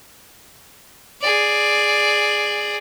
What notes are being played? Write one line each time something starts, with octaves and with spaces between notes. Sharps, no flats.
G#4 D5